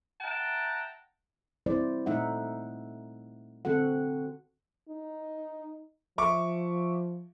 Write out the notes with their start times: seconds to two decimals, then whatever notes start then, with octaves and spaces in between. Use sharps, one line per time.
0.21 E5 F#5 G5 A5 A#5
1.66 G3 C4 E4 C5 D5
2.06 A#2 A3 D#4 E5 F#5
3.65 D3 C4 F#4 A4 F#5
4.89 D#4
6.18 F3 E5 C#6 D6